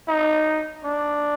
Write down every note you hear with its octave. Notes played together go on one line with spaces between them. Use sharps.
D#4
D4